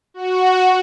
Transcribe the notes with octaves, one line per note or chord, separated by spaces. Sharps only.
F#4